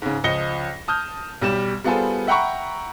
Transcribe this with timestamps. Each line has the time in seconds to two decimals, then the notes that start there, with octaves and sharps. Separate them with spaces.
0.02 G#2 C#3
0.24 C#2 F3 D#5 A#6 C#7 G7
0.88 A5 D#6 F6 G6
1.42 B1 G3 G4 E7
1.84 G3 B3 F4 G#4 A4 C5
2.27 E5 F#5 G5 A#5 B5 C#6